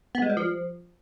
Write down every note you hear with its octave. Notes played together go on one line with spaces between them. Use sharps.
B3
G#3
G3
F3